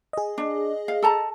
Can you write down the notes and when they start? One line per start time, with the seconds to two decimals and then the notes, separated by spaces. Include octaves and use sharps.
0.13 G#4 D#5
0.38 D4
0.88 F5
1.03 A4 A5 A#5